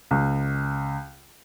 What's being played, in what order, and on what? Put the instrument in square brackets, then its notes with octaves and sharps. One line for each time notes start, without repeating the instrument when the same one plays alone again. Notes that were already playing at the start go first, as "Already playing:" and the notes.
[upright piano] C#2